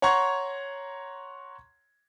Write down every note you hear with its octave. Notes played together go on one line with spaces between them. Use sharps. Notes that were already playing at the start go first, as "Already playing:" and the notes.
C#5 F#5 A#5 C6 C#6 G#6